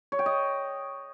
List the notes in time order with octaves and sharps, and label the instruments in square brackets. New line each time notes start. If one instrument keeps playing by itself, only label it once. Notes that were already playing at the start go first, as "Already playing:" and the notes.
[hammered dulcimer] C#5
G5
D#5